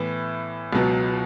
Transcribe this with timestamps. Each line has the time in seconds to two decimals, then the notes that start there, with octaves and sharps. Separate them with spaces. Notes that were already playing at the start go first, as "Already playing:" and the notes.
Already playing: A2 E3 B3 E4
0.73 C#2 B2 F#3 B3